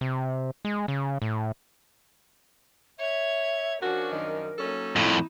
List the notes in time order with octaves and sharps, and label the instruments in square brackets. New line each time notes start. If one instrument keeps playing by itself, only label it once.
[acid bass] C3
G#3
C#3
A2
[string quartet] C#5 G#6 [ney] E5
[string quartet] F3 C#4 D4 [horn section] F#4 [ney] A#4
[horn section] F#2 D#3
[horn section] F#3 C#4 A4 [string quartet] A#3 D#4
[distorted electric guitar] F2 A2 [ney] E4